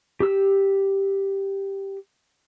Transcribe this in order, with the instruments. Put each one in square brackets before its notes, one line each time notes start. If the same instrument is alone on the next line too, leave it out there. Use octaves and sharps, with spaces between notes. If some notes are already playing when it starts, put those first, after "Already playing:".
[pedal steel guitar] G4 E6